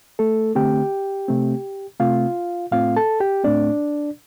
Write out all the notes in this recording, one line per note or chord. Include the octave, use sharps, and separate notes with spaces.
A3 A4
D3 A3 C4 G4 G5
C3 A3 C4
C3 A3 C4 F4 F5
A2 A3 C4 F4 F5
A4 A5
G4 G5
A2 A3 C4 D4 D5